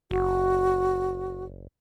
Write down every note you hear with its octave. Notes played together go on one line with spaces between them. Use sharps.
F#1 F#4